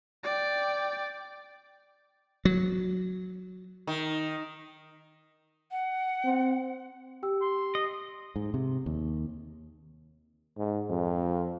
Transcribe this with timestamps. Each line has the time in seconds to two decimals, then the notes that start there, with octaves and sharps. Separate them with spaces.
0.24 D5 G5
2.45 F#3
3.87 D#3
5.71 F#5
6.24 C4
7.23 G4 G5 E6
7.42 C6
7.75 D#5
8.36 G#2
8.54 C3
8.86 D#2
10.57 G#2
10.90 F2